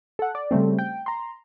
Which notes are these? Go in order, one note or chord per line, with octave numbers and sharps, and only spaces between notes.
A4 F#5
D5
C#3 G3 A3 C4
G5
A#5 C6